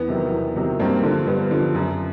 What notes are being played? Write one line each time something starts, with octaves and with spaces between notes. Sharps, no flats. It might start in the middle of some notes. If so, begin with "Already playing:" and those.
Already playing: E2 B3
C3 D#3 F#3
E2
C3 D#3 F#3
G2 A#3 C4
D3 F3
G2 B3
D3 F3
F#2